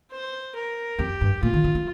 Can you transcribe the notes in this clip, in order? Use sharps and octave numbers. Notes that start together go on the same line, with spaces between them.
C5
A#4
F2 G4
G2
A#2 F4
D#3
D#3
F3